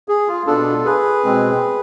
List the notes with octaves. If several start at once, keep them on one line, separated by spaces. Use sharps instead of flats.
G#4
F4
B2 B3 D4 F4 A4
G#4 B4
B2 G#3 C4